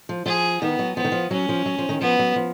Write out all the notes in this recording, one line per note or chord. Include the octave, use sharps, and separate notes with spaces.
F3
F3 G#4
D#3 B3
F#3
F3 B3
D#3
F3
F#3 C#4
F3
F#3
F3
D#3
F3 B3
F#3
F3